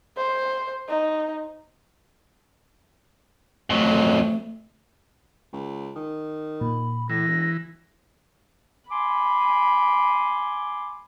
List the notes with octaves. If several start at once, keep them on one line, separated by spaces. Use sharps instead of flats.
C5
D#4
F2 F#3 A3
C#2
D#3
A#2 B5
A2 E3 A#6
E1
G#5 B5 C6 D6